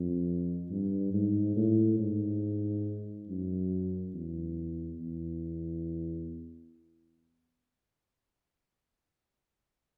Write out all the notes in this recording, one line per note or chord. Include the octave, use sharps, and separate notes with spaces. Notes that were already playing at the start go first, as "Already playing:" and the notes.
Already playing: F2
G2
G#2
A2
G#2
F#2
E2
E2